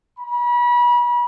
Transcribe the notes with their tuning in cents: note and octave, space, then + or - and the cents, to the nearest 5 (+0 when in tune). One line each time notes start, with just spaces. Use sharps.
B5 -35